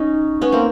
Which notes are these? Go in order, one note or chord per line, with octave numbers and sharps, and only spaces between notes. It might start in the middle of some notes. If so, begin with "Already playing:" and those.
Already playing: C#4 D#4
B3 C#4
A#3 C4